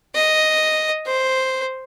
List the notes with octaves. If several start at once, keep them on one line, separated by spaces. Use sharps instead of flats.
D#5
C5